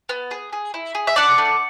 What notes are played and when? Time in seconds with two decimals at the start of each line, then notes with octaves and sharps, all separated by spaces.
0.09 B3
0.31 G#4
0.53 G#4
0.74 E4
0.95 G#4
1.07 E5
1.16 D4 D5 F#5
1.38 A3